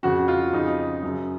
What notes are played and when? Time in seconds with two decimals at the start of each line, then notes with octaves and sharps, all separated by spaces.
0.03 F2 C#3 F#4
0.28 F4
0.53 F2 C#3 D#4
1.03 F#2 C#3